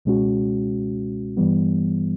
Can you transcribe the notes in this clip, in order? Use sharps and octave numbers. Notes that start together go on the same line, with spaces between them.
C#2 B2 G#3 C#4 F#4
G2 E3 G3 B3